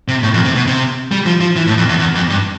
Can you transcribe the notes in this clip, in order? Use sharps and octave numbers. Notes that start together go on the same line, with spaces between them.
C3
A2
F2
C3
B2
C3
G3
F3
F3
E3
A2
F2
E2
E2
F2
G2